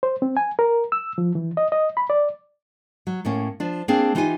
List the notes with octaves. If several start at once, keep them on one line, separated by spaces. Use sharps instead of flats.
C5
C4
G#5
A#4
E6
F3
E3
D#5
D#5
B5
D5
F#3
A2 A#3 C#4
F3 D4
A#3 C4 D4 G#4
E3 D#4 F4 G4 G#5